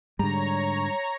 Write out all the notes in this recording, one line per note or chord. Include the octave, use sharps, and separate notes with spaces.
G#2 D3 G3 C#5 A#5